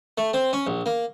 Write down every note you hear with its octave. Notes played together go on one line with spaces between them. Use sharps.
A3
C4
C#4
A#1
A#3